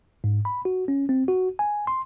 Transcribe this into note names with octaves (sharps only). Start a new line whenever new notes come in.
G#2
B5
F#4
C#4
C4
F#4
G#5
C6